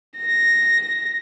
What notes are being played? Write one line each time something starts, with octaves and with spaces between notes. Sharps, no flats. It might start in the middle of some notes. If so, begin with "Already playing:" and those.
A#6